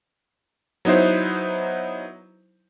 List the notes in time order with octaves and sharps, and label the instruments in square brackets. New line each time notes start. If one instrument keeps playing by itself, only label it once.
[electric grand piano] F#3 B3 D#4 E4 C5